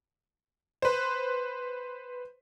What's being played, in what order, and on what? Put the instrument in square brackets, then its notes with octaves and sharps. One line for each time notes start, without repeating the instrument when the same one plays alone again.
[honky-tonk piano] B4 C5